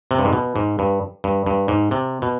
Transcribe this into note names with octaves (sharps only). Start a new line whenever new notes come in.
C3
G2
G#2
B2
G#2
G2
G2
G2
G#2
C3
B2